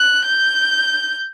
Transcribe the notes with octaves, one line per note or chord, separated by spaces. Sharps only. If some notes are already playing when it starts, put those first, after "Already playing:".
Already playing: F#6
G6